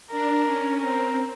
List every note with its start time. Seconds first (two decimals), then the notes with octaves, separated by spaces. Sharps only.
0.11 D4 A#4
0.46 C#4
0.80 C4 A#4